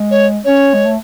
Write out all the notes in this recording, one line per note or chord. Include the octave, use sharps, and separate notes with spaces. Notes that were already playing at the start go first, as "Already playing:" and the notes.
Already playing: G#3
C#5
C#4 C#5
G#3
A3